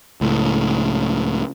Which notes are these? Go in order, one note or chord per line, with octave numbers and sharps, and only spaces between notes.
C#2 A2